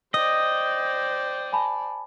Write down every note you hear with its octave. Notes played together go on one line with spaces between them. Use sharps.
C5 D5 D#5 G5
G#5 A5 B5